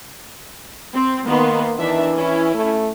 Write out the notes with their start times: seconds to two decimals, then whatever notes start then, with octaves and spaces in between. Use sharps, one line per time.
0.95 C4
1.26 D#3 A#3 B3 C6
1.79 D#3 E3 D4 E5
2.16 C#4 E4
2.54 A3